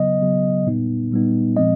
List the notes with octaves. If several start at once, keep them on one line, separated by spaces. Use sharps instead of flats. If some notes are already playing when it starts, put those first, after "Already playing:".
Already playing: C#3 F#3 B3 D#5
C#3 F#3 B3
A#2 G3 B3 D#4
A#2 G3 B3 D#4
A#2 F3 G#3 C4 D#5